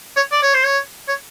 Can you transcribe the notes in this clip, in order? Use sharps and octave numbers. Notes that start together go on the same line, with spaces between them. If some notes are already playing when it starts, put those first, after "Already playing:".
C#5
D5
C#5
C5
C#5
C#5